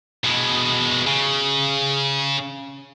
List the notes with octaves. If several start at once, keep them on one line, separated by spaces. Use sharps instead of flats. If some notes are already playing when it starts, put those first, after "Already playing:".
B2 G#3
C#3